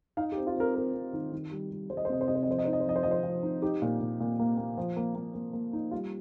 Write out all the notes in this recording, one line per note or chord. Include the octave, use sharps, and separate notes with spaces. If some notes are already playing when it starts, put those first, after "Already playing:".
D#4 F5
G4
C4
F4
C4 A#4
C4 A#4
C4
D#3
D#3
G3
G3
G3 C5
D#5
C5
C3 D#5
C5
C3 D#5
C5
D#5
F3 C5
D#5
D#4 C5
D#5
C5
F3 D#5
C5
F3 D#5
C5
F3
D#4
D#4 G4
A#2
A#2
A#2
A#3
A#3
F3
A#3
A#3
A#3
A#3
D#4
G3 F4